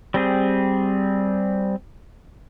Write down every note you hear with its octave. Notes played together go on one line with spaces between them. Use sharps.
G3 C4 G#4